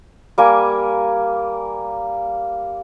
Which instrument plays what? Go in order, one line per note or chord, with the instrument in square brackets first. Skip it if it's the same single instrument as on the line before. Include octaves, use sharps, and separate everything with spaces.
[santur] G3 A#3 G#5